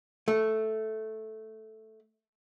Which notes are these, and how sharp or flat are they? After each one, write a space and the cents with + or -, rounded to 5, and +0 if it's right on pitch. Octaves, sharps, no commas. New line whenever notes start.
A3 -5